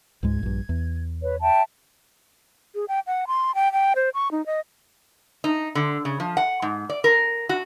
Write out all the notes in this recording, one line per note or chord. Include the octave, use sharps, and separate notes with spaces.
C#2 G#2 G#3 G#6
A#1 G2
E2
B4 C#5
E5 G5 A5
G#4
G5
F#5
C6
G5
G5
C5
C#6
D#4
D#5
D#4
D3
C#3
F3
F#5
G#2
D5
A#4
F#4